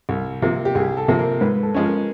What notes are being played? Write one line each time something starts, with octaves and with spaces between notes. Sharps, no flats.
C2
C3 F3 A#3
G4
C2 G#4
A4
C3 F3 A#3
A#4
G#2 B4
A4
F3 G#3 C#4
A#4